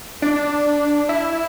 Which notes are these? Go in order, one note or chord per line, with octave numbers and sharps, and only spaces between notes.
D4
E4